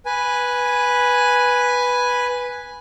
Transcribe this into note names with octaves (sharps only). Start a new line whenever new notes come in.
B4 G#5